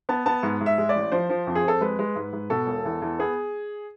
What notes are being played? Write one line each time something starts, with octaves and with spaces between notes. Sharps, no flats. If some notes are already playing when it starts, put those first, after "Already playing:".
B3 A5
B3 A5
G#2
G#2
E5
G#3
D5
A1
F3 C5
F3
F2
G#4
F2 A4
G#3 B4
G#3
G#2
G#2
B2 A4
E1
E2
E2
B3 G#4